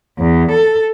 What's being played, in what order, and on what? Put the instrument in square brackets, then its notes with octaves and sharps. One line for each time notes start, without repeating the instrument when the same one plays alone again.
[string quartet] E2
A4